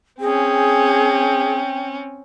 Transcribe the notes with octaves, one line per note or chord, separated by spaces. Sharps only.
C4 C#4 G#4 G5